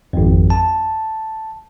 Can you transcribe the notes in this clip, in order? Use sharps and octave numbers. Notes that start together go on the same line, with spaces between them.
G#1 F2
A5